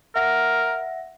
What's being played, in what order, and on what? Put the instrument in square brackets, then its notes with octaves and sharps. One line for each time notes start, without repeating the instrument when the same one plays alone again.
[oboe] A#4 [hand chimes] E5 F#5 A#6